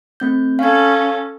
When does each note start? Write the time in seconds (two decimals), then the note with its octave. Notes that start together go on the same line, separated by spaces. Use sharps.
0.20 A3 C4 G6
0.59 C#4 A4 F5 G#6